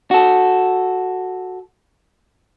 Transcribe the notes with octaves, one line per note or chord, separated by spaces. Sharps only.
F#4 A4